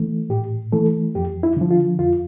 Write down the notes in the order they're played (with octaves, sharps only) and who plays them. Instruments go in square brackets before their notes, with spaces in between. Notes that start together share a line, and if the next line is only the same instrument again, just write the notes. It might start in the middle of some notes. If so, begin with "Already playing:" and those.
Already playing: [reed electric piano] E3 A3
A2 G4
E3 A3 A4
F2 G4
E4
D3 F3
F4
F2 F4